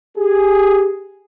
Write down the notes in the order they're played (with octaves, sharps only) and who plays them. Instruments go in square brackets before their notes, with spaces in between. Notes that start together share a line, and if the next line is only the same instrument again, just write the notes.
[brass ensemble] G4 G#4